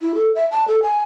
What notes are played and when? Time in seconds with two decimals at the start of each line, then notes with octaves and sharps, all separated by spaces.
0.02 E4
0.15 A4
0.35 E5
0.51 A5
0.68 A4
0.82 G#5